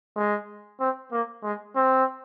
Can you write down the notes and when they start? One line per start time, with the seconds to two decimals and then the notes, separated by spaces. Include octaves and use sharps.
0.16 G#3
0.80 C4
1.12 A#3
1.43 G#3
1.75 C4